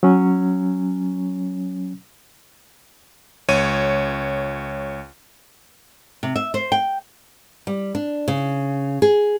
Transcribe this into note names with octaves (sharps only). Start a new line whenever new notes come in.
F#3 C#4
C#2 C#5 D#7
C3
E5
C5
G5
G3
D4
C#3
G#4